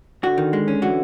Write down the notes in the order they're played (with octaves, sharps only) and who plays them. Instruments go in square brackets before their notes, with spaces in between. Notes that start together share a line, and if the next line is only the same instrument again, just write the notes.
[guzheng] D3 [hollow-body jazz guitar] F#4
[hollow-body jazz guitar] D#3
G#3
C#4
[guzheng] D3 E3 [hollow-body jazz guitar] F#4